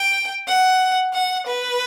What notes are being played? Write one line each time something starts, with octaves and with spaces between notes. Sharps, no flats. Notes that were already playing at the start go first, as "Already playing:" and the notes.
Already playing: G5
F#5
F#5
B4